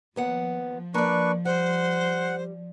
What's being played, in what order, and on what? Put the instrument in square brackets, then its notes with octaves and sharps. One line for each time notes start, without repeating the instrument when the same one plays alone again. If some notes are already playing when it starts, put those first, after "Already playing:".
[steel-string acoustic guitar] D#2 B3 F#5 [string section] F3
[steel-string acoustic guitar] A#3 D5 [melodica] D4 B4 C#6
[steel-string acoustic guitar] G3 [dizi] C5 [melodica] F#5